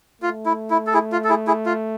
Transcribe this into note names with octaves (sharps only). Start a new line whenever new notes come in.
A3 F4
E4
E4
A4
E4 G#4
F4
A4
E4 G#4
E4 G#4
F4